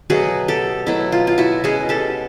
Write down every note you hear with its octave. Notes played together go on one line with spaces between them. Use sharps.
B2 F#3 A3 F#4 G#4
G4 A4
B2 F#3 A3 E4
F4
F4
E4 F#4
B2 G#3 C#4 F#4 G#4
G4 A4